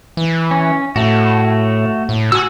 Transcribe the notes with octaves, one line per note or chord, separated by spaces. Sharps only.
E3
C#4
A2 A3 F#4
A2
F#4 G#5 E6